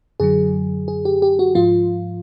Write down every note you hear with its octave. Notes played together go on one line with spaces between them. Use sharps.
F#2 D3 F#3 G#4
G#4
G4
G4
F#4
G#2 F3 F4